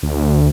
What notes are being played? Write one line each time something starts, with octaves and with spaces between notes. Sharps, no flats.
D2